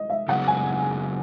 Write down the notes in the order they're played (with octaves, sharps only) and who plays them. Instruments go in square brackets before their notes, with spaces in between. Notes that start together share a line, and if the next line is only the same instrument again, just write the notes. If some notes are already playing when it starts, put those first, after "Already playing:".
Already playing: [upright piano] D#5
E5
[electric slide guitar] C#3 F#3 B3 D#4 G#4 [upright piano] F#5
[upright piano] G#5